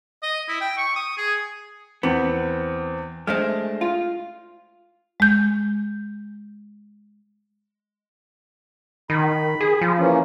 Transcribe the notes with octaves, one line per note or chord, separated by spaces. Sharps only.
D#5
E4
G5
C#6
D#6
G#4
E2 B3 C4
G#3 A3 D4 C5 D#5 F6
F4
G#3 G6
D#3 B5
G#4
F3
E3 A#3 C#4